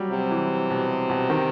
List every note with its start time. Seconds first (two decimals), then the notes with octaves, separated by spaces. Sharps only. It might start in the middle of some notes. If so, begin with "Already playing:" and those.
Already playing: F#3 G3
0.10 C3 F#3
0.31 E3
0.70 B2
1.10 B2
1.30 D#3